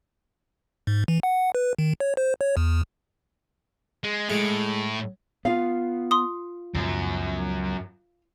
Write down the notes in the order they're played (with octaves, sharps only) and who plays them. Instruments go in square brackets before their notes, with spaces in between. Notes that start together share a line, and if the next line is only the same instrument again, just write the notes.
[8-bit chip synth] G#2
E3
F#5
B4
D#3
C#5
C5
C#5
E2
[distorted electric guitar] G#3
[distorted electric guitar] A2 [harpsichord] G#3
[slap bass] B3 [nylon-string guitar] F4 F5
[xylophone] C6 D#6
[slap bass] C#2 B2 F3 [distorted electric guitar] F#2